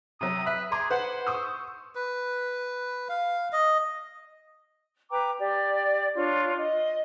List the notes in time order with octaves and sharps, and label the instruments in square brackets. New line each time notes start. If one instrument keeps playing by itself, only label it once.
[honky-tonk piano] C3 F#3 [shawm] D#6
[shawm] B4 [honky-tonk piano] E5
[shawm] G#4 [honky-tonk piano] A#5 C6 D6
[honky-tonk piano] B4 F#5 [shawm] C5
[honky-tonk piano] C#6 D#6 E6
[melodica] B4
F5
D#5
[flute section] B4 G5 A#5 D6
G4 D5
D4 F4 C#5
D#5